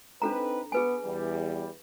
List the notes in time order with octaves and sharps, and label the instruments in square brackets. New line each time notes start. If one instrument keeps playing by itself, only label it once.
[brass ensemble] C4 D#4 B4 [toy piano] D4 A4 A#5
[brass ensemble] B3 [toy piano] G#4 B4 G#5
[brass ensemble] E2 G3